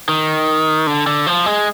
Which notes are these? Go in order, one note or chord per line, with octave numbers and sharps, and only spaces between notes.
D#3
D3
D3
F3
G#3